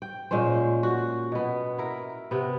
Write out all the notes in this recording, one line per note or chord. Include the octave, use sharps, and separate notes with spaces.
G5
A#2 G#3 C#4 C5
F#4
B2 B3
E4 A#4
C3 B3